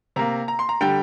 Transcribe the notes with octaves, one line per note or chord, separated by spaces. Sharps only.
C3 A#3 A#5
A#5
C6
A#5
D3 G3 G5